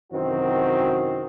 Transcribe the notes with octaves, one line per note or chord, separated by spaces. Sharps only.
F#2 C3 D#3 E3 C4 F#4